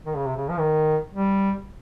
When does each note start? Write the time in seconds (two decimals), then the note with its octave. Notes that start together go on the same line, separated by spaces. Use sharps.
0.06 D#3
0.16 C#3
0.26 C3
0.36 C#3
0.50 F3
0.59 D#3
1.14 G3